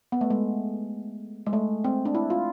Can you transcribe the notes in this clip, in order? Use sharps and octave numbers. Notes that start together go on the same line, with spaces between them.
B3
A3
G#3
G#3
A3
C4
D4
E4
F4